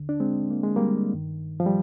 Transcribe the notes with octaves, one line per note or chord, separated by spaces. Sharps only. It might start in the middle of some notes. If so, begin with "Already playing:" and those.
Already playing: D#2 D3
D4
G#3 C4
A#3
G#3
G3 A#3
G2 D#3
F3
G3